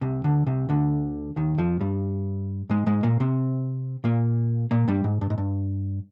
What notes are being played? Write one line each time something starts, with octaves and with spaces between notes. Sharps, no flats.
C2 C3
D2 D3
C2 C3
D2 D3
D#2 D#3
F2 F3
G2 G3
G#2 G#3
G#2 G#3
A#2 A#3
C3 C4
A#2 A#3
A#2 A#3
G2 G3
G#2
G2
G#2
G2